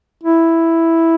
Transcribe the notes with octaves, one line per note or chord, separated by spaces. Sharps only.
E4